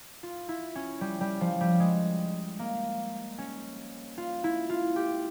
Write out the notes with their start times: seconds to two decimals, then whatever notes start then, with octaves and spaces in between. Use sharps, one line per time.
0.23 F4
0.49 E4
0.76 C#4
1.01 G3
1.21 G3
1.41 F3
1.61 G3
1.80 G#3
2.59 A#3
3.38 C#4
4.18 F4
4.44 E4
4.70 F4
4.96 G4